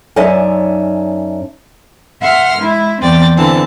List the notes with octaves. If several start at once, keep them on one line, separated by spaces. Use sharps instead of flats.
F#2 C#4 D#4 D5 E5 A5
E5 F#5 C6 F6
G#3 E4
E2 E3 C4 D5 G5 A6
D3 E3 C4 A5